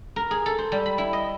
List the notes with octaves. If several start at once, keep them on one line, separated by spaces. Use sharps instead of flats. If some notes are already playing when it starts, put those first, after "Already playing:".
A#4
G#4
A4
C5
G3
B5
E4
D#5